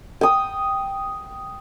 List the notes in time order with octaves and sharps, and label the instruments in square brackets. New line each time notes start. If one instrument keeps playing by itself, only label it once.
[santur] G5 D#6